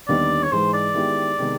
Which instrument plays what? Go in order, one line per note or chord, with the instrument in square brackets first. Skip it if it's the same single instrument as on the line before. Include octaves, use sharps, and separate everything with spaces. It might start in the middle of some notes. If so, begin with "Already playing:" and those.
[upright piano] D#2 D3 G3 B3 D#4 [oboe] D5
[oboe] C#5
[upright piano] G#2 E3 G#3 [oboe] C5
[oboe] D5
[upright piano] D#3 G#3 B3 E4 G4
C3 D#3 G#3 B3